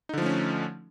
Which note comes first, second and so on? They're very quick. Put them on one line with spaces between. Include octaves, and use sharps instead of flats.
D#4 D3 F3 A3 C#4